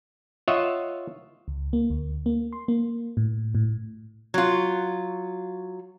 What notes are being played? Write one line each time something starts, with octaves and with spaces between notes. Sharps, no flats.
F4 C#5 D#5 E5 F#5
C#2
A#3
D2
A#3
C6
A#3
A2
A2
F#3 F4